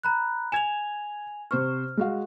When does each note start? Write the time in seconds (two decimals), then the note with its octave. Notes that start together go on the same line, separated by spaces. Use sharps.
0.03 A#5 B5 F#6
0.52 G#5 G#6 E7 F7
1.51 C3 C5 C#6 F6
1.97 G#3 F#4 F5